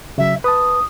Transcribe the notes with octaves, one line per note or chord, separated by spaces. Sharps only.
C#3 F#3 E5
B4 A5 D#6